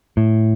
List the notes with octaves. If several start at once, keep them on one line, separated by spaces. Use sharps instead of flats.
A2